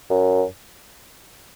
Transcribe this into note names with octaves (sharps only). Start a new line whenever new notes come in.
F#2